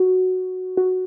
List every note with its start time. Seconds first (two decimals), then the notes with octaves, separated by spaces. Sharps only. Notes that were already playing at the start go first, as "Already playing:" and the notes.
Already playing: F#4
0.77 F#4